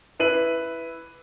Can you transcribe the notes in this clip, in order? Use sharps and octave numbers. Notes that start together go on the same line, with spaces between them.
E4 B4 D#7 F#7